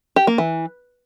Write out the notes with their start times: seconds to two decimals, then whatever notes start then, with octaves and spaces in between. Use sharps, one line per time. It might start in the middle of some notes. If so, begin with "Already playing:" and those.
0.16 G4
0.27 A#3
0.38 E3